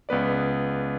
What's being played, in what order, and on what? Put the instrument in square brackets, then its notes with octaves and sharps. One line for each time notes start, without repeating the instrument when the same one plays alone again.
[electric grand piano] C#2 B3 B4 D5